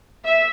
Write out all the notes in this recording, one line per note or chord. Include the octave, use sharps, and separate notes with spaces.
E5